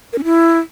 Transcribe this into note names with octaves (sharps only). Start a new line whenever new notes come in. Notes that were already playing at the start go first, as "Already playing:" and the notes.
A#4
C#4
E4